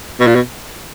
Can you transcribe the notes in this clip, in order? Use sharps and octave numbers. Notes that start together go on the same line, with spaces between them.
B2
A#2
B2